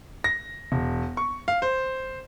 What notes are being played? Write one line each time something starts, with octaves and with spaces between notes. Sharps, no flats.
A#6
E1
C#6
F5
C5